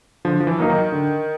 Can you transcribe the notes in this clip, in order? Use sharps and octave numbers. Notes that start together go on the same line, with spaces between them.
D3 F3
F3
E3
F#3 A#3 D#4
D#3
D3